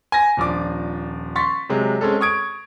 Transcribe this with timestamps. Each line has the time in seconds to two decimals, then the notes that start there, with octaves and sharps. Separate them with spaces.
0.12 G#5 A#6
0.37 D#1 F3 D4 D6
1.36 C6 C#6 A6 B6
1.69 C3 F#3 G#3
2.01 G#3 C4 C#4 A4
2.21 C#6 D#6 G#6 D7